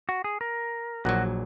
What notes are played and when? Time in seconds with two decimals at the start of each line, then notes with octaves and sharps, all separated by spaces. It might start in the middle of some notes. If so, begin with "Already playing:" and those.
0.09 F#4
0.24 G#4
0.41 A#4
1.05 A#1 A#2 F#3 F#4